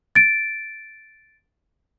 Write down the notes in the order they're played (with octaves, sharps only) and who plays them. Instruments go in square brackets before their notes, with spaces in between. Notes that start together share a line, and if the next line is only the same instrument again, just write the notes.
[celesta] A6 D7